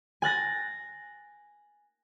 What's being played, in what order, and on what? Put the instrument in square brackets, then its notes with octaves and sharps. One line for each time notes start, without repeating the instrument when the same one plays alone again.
[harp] G#5 F#6 A6 A#6